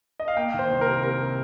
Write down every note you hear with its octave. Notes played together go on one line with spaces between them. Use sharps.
D#5
F5
A#3 G5
D#3
C5
C2
A#4
C3
C3 A#4
C3